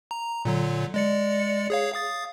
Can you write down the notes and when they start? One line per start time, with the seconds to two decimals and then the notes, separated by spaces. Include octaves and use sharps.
0.11 A#5
0.45 A#2 D3 F#3
0.94 G#3 D5 C#7
1.70 G#4 C#5 F5
1.94 F5 D#6 A6